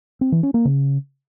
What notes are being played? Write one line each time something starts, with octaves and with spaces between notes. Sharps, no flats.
C4
E3
C#4
A#3
C#3